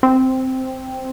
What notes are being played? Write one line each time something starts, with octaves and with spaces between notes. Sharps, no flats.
C4